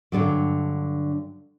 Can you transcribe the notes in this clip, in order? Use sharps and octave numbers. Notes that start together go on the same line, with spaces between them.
G2 D3 F3 F#3